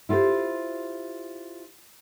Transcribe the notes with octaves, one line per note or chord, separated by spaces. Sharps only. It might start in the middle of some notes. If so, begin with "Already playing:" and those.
E4 F4 G4 A#4 C5